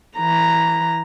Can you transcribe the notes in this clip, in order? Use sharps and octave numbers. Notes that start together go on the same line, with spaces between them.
E3 A#5